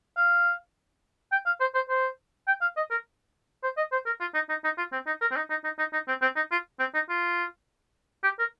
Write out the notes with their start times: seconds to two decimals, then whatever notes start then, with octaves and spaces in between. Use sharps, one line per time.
0.17 F5
1.32 G5
1.46 F5
1.61 C5
1.75 C5
1.89 C5
2.48 G5
2.61 F5
2.77 D#5
2.91 A#4
3.63 C5
3.77 D#5
3.92 C5
4.06 A#4
4.20 F4
4.34 D#4
4.49 D#4
4.64 D#4
4.78 F4
4.92 C4
5.07 D#4
5.21 A#4
5.31 C4
5.36 D#4
5.50 D#4
5.64 D#4
5.79 D#4
5.93 D#4
6.08 C4
6.22 C4
6.36 D#4
6.52 F4
6.79 C4
6.94 D#4
7.09 F4
8.24 G4
8.39 A#4